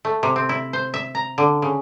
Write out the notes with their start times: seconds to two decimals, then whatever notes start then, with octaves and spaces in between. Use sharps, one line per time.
0.05 A3
0.23 C3
0.36 C4
0.49 E4
0.73 C5
0.94 E5
1.15 A#5
1.38 D3
1.62 C#3